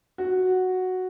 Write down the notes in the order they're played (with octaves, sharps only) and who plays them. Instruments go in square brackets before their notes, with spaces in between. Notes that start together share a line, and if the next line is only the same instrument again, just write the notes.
[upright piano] F#4